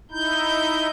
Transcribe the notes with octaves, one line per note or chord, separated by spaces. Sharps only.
D#4 E4 G6